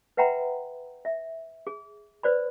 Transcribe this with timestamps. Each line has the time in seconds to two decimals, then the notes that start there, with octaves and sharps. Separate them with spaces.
0.17 B4 E5 F#5 G5 A#5 B5
1.05 E5
1.67 G#4
2.23 B4 C5 D5 B5